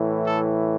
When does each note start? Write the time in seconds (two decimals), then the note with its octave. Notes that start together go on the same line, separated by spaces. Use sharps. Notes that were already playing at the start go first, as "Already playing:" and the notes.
Already playing: A2 E3
0.25 A4